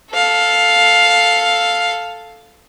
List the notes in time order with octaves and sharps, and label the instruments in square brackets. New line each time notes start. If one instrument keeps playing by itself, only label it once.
[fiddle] A4 F5